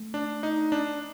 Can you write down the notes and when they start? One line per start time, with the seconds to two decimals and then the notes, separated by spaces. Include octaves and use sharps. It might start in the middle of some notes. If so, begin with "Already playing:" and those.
Already playing: A3
0.14 D4
0.43 D#4
0.72 D4